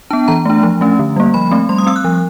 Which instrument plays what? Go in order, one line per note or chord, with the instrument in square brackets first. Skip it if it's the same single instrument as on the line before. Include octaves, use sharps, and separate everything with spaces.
[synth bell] B3 D4 A5
E3 A#5
A3 D4
F3
A3 C#4
D3
G3 A#3
F3 B5
A3 C4
G3 C6
D#6
C4 E6
F#6
F3